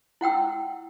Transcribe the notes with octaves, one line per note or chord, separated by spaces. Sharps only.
E4 F#5 G5 E6